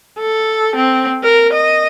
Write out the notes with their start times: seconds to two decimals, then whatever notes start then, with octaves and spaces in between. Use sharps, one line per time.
0.19 A4
0.76 C4
1.23 A#4
1.53 D#5